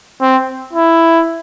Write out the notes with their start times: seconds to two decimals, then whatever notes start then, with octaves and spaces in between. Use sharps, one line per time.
0.21 C4
0.73 E4